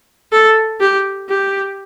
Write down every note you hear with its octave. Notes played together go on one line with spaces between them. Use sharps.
A4
G4
G4